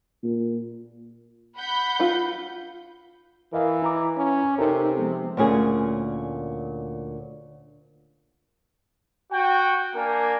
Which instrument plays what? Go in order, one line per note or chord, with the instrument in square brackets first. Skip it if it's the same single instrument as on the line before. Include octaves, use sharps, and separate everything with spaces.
[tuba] A#2
[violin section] F#5 B5 G6
[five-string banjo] F4 F#4
[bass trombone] E3 [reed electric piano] A#4 D#5 F5
[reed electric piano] E4 A#5 D6
[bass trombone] C#4
[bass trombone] C3 [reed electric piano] D#4 A4 A#4
[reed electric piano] F3 G#3 B3
[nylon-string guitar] D2 A#2 A#3 C#4 G#4
[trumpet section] F#4 G5
A#3 D4 A#4 G#5